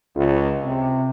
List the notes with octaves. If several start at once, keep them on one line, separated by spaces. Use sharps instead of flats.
C#2
C3